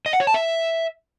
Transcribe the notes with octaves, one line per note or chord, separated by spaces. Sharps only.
D#5
F#5
C#5
A5
E5